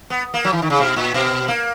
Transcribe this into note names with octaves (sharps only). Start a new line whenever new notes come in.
B3
A#3
F#3
E3
D#3
C#3
B2
A#2
B2
A#3